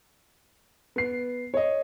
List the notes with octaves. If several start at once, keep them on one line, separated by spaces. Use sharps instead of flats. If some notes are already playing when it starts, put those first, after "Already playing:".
B3 C7
C#5 D#5